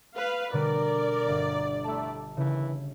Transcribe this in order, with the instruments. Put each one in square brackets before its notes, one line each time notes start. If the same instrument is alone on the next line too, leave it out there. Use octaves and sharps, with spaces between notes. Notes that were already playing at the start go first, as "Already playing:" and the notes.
[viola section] B4 F5
[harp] B2 D3 G3 [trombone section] A#4 [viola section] D5
[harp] G1 A#5
[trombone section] A2 A3 [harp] A5 E6
[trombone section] D#2 E3 [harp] C#3